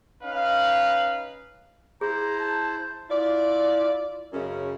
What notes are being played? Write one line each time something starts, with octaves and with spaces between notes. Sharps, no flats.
C#4 D#4 B4 F5
E4 G#4 C5 A#5
A5
E4 F4 D5
F#2 C#3 G#3 C#4